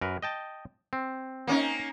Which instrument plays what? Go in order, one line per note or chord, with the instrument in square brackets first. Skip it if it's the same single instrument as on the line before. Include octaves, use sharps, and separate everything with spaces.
[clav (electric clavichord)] F#2 A#4 B4
D#5 G5 A5
C4
[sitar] A#3 C#4 D#4